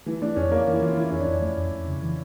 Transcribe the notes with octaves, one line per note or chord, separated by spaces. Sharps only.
E3 A3
A3 D4
F2 C#4
A3 A#3
E3
E4
E3 F4
E3 E4
F2 C#4
D4
F2
A3
F2
F2
C#3
E3